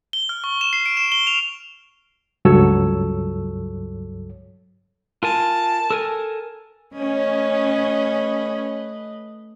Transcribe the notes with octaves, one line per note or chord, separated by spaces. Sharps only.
G7
F6
C#6
E7
C7
D7
E7
G7
F7
C#2 G2 F#3 A4 C#5 E6
F4 A#4 G#5 A5
A4 A#4 G#5
A3 C#4 B4 D#5